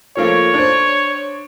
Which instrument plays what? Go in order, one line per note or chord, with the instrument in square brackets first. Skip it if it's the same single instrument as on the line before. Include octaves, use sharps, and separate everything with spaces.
[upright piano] F3 A3 A#3 [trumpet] C#5
[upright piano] D4 C5